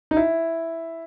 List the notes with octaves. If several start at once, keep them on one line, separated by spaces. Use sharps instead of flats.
D#4
E4